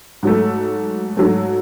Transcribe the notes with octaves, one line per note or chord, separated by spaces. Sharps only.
G#2 F#3 A3
G#2 F#3 A3